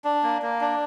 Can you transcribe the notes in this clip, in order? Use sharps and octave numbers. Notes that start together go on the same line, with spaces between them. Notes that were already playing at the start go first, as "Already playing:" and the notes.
D4
A#3
A#3
D4